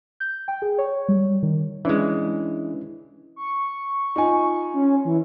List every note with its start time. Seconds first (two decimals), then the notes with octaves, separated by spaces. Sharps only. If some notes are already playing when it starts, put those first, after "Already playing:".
0.20 G6
0.48 G5
0.62 G#4
0.78 C#5
1.08 G3
1.43 D#3
1.85 E3 G#3 C#4 D4 E4
3.36 C#6
4.16 D#4 F4 G#5
4.74 C#4
5.05 E3